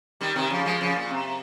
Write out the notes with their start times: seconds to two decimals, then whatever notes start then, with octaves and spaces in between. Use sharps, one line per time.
0.21 D#3 G3
0.36 C3 D#3
0.50 C#3 F3
0.65 F3 G#3
0.81 C#3 F3
0.96 A#2
1.10 C3